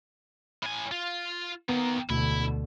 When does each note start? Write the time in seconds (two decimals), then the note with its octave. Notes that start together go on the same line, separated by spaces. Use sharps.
0.63 A2 G#5
0.92 F4
1.69 D#3 A#3 B3
2.10 D2 B2 D3 E4